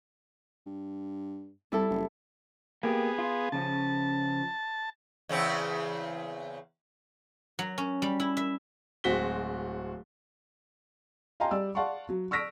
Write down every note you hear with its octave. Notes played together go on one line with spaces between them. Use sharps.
G2
C2 G3 E4 A4
F#1
A#3 B3 G4 G#4
F4
C#3 F3 C#4 A5
E2 C#3 C4
F#3
C#4
G3
E4
E5
D1 G#3 C4 F#4 B6 G7
D#5 F5 G5 G#5 A#5 C6
G3 D5 E6
D5 F5 F#5 A5 C6 C#6
F#3
C#6 E6 F6 A#6 B6 D7